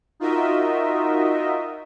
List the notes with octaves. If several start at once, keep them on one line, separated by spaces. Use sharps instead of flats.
D#4 F4 F#4 A#4 D#5 E5